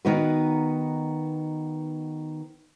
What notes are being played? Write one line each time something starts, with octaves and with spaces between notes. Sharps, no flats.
D#3 B3 D#4 F#4 B4